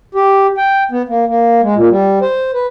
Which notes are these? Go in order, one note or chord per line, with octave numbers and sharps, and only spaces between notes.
G4
G5
B3
A#3
A#3
G#3
A#2
G3
C5
B4